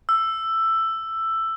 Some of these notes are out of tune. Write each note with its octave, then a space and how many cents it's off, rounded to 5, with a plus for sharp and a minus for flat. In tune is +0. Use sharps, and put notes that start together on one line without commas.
E6 +10